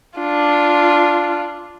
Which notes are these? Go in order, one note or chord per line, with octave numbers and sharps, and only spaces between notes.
D4 F4